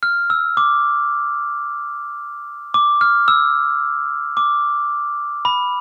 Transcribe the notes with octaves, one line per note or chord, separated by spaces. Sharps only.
F6
E6
D6
D6
F6
E6
D6
B5